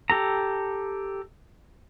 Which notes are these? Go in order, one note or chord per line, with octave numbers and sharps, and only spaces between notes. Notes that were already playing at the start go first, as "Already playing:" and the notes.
G4 A4 A#5